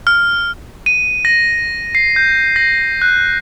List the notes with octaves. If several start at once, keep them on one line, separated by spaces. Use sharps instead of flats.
F6
D#7
A#6
C7
G6
A#6
F#6